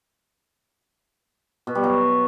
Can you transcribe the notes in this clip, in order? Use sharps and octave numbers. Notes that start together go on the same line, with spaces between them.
B2
G3
F#3